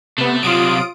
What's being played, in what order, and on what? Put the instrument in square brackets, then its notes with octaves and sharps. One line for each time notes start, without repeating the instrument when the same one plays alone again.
[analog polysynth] C3 B3 [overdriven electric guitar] A3
[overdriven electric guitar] C3 F#3 [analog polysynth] F4 D#6 D7